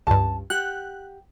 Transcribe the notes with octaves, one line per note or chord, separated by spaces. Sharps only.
C#2 G2 A5
G4 F#5 F#6